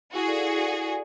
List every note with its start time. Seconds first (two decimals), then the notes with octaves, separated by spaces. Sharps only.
0.13 E4 F#4 G#4
0.27 A4 D5 F5
0.42 E4
0.56 A4 D5 F5
0.70 E4
0.84 A4 D5 F5